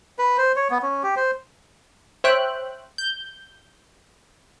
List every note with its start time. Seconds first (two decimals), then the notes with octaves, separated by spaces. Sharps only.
0.19 B4
0.38 C5
0.56 C#5
0.71 B3
0.82 C#4
1.03 G4
1.16 C5
2.24 C5 C#5 E5 G5 F#6
2.98 G6